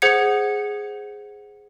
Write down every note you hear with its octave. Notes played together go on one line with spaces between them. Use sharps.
G#4 C5 F#5 G#6 C#7